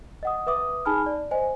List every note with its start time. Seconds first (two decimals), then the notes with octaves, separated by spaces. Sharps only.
0.23 D#5 F#5 D#6
0.47 B4 E5 D6 D#6
0.85 D#4 G#4 G#5 A5 B5 F6
1.06 D5
1.31 C5 D#5 G#5